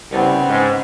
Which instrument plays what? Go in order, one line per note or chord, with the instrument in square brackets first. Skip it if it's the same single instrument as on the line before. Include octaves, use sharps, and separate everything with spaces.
[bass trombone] C2 [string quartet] C#3 B3 C4
[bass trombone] G#2